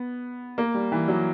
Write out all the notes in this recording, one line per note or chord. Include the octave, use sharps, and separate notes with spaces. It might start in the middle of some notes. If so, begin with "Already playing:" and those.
Already playing: B3
A#3
G3
E3
F#3